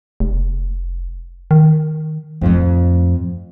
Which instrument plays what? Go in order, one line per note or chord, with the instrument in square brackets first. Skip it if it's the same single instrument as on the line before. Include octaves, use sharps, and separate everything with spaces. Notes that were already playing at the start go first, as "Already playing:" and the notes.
[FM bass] F1
D#3
[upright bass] F2 A2